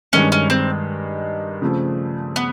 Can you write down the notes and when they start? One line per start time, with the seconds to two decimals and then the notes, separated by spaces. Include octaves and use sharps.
0.13 G2 D#3 G#3 C#4
0.32 C#4
0.50 C4
1.62 C#3 F3 A3 C4
2.36 B3